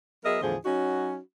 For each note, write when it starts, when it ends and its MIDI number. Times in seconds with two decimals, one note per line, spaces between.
0.24 0.39 54
0.24 0.39 59
0.24 0.39 68
0.24 0.39 70
0.24 0.39 75
0.24 0.39 76
0.41 0.56 40
0.41 0.56 45
0.41 0.56 50
0.41 0.56 53
0.41 0.56 68
0.41 0.56 72
0.65 1.19 54
0.65 1.19 61
0.65 1.19 63
0.65 1.19 66